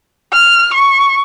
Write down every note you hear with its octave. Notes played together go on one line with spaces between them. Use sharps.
F6
C#6